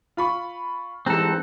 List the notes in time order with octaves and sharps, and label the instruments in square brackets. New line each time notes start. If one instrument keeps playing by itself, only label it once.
[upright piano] F4 B5 C#6
[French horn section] G#2 E3 G3 [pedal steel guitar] C4 A4 [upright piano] A5 A#5 F#6